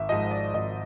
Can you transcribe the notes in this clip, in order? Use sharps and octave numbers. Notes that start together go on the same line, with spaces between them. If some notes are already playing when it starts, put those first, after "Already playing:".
Already playing: G#1 E5
G#2 F3 D#5
D5
G#1 D#5